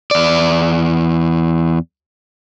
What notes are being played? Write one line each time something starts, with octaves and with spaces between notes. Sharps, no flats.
E2 D5